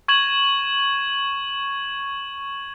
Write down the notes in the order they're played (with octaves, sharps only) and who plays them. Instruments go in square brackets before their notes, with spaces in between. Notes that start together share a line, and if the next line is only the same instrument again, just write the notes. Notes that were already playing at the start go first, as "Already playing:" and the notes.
[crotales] C#6 G#6 E7 F#7